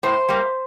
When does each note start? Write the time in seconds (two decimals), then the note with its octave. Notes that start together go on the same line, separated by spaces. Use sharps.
0.03 A2 C5
0.29 G3 A#3